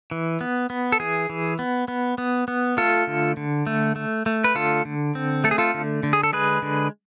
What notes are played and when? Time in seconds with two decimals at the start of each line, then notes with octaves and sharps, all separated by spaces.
0.11 E3
0.41 B3
0.70 B3
0.92 A4
1.00 E3 G#4
1.30 E3
1.59 B3
1.88 B3
2.18 B3
2.48 B3
2.77 A3 F4 A4
3.07 D3
3.37 D3
3.67 A3
3.96 A3
4.26 A3
4.44 B4
4.55 D3 F4 A4
4.85 D3
5.15 C4
5.44 A3 A4
5.51 G#4
5.58 F4 A4
5.74 D3
6.03 D3
6.13 G#4
6.23 A4
6.33 G#3 G#4 B4
6.62 D3